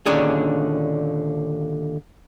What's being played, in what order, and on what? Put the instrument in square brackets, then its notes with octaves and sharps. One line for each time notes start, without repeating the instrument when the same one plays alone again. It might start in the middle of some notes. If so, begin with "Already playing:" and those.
[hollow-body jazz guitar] D#2 A#2 D3 C#4 D4 G#4